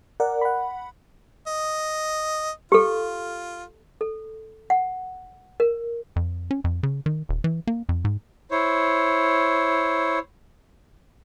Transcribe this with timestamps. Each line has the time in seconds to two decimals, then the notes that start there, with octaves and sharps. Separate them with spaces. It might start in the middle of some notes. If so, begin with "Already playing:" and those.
0.20 A#4 D5 F#5
0.41 F#5 B5
1.47 D#5
2.72 F4 G4 A4
4.01 A4
4.70 F#5
5.60 A#4
6.16 F2
6.51 C#4
6.64 F2
6.83 C#3
7.06 D#3
7.29 D#1
7.44 E3
7.67 A#3
7.89 F2
8.05 G#2
8.51 E4 C5 C#5